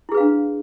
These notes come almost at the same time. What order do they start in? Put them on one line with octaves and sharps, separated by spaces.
E4 G#4 B4 F5 D4